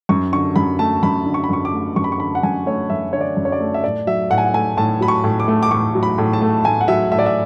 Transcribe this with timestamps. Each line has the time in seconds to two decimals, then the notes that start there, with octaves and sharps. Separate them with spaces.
0.09 F#2 C#6
0.33 D3 C#6
0.56 F#2 B5
0.79 A3 A5
1.03 F#2 B5
1.26 D3
1.34 C#6
1.44 B5
1.49 F#2 C#6
1.65 D6
1.73 A3
1.96 F#2 C#6
2.04 B5
2.12 C#6
2.20 D3 B5
2.35 F#5
2.43 F#2 G#5
2.66 A3 C#5
2.90 F#2 E5
3.13 D3 C#5
3.21 D5
3.37 F#2
3.45 C#5
3.52 D5
3.60 A3
3.74 E5
3.84 A2 D5
4.07 F#3 E5
4.30 A2 F#5
4.38 G#5
4.45 F#5
4.54 A3 G#5
4.77 A2 A5
5.01 F#3 B5
5.08 C#6
5.24 A2
5.40 D6
5.48 A3
5.63 D6
5.71 A2 C#6
5.95 F#3
6.03 B5
6.18 A2
6.33 A5
6.41 A3
6.64 A2 G#5
6.81 F#5
6.88 F#3 E5
7.12 A2 E5
7.19 D5
7.26 E5